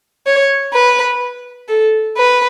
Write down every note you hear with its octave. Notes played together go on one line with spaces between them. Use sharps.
C#5
B4
A4
B4